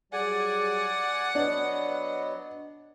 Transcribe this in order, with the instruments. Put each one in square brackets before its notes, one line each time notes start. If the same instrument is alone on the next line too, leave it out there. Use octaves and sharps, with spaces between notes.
[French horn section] F#3 G3 G#4 [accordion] D5 G#5 [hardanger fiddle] F#5
[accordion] F#3 B3 [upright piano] D4 [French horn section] B4 D#5